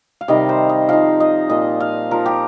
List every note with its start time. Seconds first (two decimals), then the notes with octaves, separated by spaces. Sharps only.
0.21 F5
0.28 C3 D#3 G3 D#4 D#5
0.49 C5
0.69 D#5
0.89 F3 D#4 F5
1.20 D#5
1.49 A#2 A#3 F4 D#5
1.80 F5
2.11 F3 D#4 A#4
2.26 G4